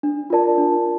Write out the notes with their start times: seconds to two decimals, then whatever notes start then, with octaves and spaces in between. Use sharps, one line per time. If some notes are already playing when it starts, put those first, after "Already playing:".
0.03 D4
0.30 F4 A#4 D5 A5
0.58 D4